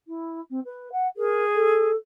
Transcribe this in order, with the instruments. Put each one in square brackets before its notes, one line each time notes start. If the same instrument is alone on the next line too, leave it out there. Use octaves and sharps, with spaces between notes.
[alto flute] E4
C4
B4
F#5
[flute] G#4 [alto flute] A#4
[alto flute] A4